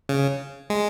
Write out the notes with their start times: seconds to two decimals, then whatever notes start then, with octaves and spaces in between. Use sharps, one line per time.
0.09 C#3
0.70 G#3